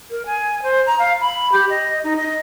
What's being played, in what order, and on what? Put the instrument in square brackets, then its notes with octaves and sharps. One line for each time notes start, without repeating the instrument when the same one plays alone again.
[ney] A#4
G#5
C5
A#5
F5
B5
G4
D#5
D#4
D#5